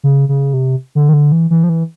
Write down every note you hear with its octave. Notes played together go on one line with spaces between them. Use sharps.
C#3
C#3
C3
D3
D#3
D3
E3
E3
F3
E3